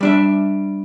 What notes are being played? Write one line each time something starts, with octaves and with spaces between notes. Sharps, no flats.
G3 D4 E5